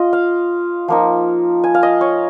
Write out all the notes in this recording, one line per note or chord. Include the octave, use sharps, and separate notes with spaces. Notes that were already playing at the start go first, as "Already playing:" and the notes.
Already playing: F4 D#5
F5
F3 A#3 D#4
G#5
F5
D#5
C#5